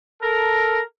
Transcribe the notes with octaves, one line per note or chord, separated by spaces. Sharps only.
A4 A#4